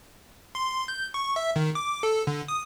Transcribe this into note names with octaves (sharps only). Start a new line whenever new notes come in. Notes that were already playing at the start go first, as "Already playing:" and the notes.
C6
G6
C#6
E5
D#3
D6
A4
D3
D#6